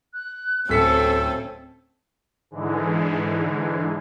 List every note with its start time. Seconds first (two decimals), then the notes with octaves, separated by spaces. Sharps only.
0.13 F#6
0.69 D1 C4 C#4 A4 E6 B6 C#7
2.51 G#2 D3 E3 G#3